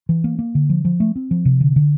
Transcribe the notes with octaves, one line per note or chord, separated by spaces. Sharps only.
E3
A#3
A#3
D3
F3
F3
A3
C4
F3
C3
D3
D3